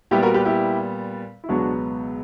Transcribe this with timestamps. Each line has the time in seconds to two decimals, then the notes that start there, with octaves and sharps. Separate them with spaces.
0.11 A#2 G3 B3 E4 G4
0.22 F#4 A#4
0.34 G4 B4
0.45 E4 G4
1.44 E4
1.48 C#2 B2 F#3 B3 D4 F#4